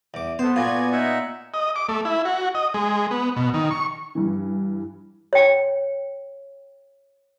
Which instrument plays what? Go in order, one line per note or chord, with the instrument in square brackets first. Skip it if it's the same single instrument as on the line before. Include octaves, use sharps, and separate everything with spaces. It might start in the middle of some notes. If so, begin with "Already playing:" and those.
[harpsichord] E2 D6
[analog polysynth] B3 A4 [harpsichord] C5
[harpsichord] A#2 F4 [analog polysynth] B3 G#5 G#6 [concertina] F#4 D5
[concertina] D#4 E5 F#5
[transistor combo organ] D#5
D6
A3
E4
F#4
D#5
G#3
B3
B2
D#3
C#6
[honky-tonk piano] G2 E3
[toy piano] C#5 G5